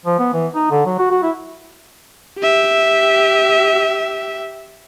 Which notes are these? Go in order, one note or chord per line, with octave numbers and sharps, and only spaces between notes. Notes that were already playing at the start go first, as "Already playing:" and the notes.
F3
B3
E3
D#4
D3
F#3
F#4
F#4
E4
G4 E5